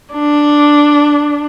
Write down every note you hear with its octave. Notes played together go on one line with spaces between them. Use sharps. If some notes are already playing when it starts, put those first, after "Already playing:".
D4